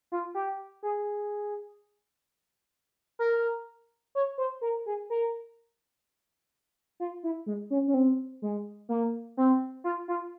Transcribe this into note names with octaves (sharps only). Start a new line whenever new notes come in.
F4
G4
G#4
A#4
C#5
C5
A#4
G#4
A#4
F4
E4
G#3
C#4
C#4
C4
G#3
A#3
C4
F4
F4